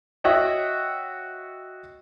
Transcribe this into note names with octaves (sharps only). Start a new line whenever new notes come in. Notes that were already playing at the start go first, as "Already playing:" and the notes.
F#4 C#5 D#5 E5 F#5 G5